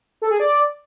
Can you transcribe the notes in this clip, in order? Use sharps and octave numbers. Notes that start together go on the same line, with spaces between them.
A4
G#4
D5